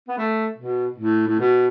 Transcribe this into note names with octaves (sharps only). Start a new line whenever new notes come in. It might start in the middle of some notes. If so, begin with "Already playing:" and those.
B3
A3
B2
A2
A2
B2